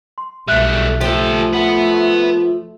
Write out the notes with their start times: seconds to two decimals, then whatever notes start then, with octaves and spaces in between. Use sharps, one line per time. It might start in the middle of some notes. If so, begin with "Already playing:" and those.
0.18 C6
0.48 B1 G3 A3 E5 F#6
1.01 F3 A3 G4 A4
1.53 B4 F#5